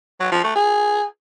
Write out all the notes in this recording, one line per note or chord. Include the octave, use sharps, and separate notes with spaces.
F#3
F3
A3
G#4